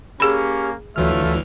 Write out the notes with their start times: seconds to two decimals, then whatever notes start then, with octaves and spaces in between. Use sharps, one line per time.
0.20 A#3 C#4 G4 G#4 B5
0.96 D2 E3 F#3 A3 F4 E5 F6